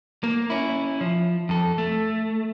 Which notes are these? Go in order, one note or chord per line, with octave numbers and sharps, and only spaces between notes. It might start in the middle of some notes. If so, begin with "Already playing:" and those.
A#3
C#4 E4
F3
F2 A4
A3